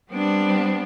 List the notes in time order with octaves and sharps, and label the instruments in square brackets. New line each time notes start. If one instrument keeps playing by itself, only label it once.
[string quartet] G3 B3 C4 D4